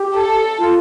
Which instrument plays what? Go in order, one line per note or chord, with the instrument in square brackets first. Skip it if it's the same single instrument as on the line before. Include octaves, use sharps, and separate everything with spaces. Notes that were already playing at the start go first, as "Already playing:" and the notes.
Already playing: [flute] G4
[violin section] A4
[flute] F4